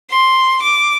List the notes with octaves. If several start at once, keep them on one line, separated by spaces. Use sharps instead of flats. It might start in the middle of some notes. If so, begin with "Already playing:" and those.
C6
D6